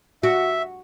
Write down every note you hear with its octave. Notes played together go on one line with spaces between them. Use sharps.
F#4 E5